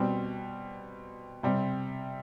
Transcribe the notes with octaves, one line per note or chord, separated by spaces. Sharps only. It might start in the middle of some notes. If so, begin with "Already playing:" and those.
Already playing: B2 G3 C4
C3 G3 C4